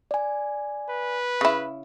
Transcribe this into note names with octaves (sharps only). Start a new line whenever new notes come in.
D5 G#5
B4
C#3 E4